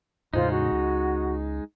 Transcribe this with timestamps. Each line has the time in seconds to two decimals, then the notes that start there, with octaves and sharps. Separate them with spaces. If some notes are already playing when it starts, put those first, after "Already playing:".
0.34 E2 A2 C#3 G#3 D#4 F4 C5
0.50 F#4
0.72 C#2